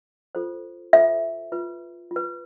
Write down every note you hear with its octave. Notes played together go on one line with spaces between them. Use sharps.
F4 A4 C5
F4 A4 C5 E5
F4 B4
F4
B4